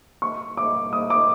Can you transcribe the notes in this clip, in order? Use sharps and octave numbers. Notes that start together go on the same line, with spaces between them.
C#6
D6
D#6
D6